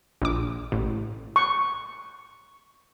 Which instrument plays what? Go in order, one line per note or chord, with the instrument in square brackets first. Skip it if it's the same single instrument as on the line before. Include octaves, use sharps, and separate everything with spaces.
[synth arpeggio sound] A#1 D6
A1
[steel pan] C#6